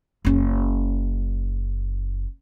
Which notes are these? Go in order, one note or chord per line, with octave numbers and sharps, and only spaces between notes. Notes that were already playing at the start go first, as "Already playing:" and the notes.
F#1 C#4